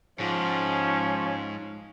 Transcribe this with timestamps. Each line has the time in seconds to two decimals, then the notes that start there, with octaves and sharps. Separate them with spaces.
0.20 G#2 F3 C#4